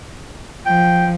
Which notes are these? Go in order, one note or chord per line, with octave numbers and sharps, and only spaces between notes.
F3 G5